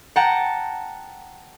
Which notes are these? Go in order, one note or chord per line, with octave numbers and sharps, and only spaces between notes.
F#5 G5 A5 A#5